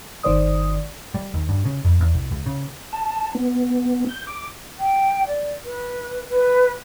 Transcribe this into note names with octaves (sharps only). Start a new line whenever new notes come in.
G1 D#3 C5 D5 D#6
G3
D#2
G2
C#3
F2
E2
C2
C#2
C#3
A5
B3
G6
D6
G5
D5
B4
B4